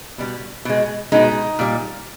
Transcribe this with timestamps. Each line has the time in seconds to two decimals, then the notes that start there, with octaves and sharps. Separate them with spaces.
0.18 B2 G3
0.65 B2 G#3
1.12 B2 G#3 D#4
1.59 A#2 G3